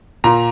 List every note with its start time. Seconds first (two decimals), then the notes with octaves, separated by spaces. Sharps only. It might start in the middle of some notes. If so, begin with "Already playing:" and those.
0.24 A#2 A#5